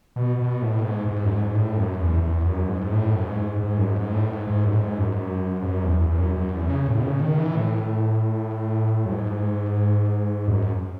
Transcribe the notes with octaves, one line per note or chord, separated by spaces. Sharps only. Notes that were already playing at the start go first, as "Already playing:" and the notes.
B2
B2
A2
G#2
G#2
F#2
G#2
A2
F#2
E2
E2
F#2
G#2
A2
F#2
G#2
G#2
F#2
G#2
A2
G#2
G#2
F#2
A2
G#2
F#2
G#2
F#2
E2
E2
F#2
F#2
E2
C#3
A2
B2
C#3
D#3
E3
A2
F#2
G#2
F#2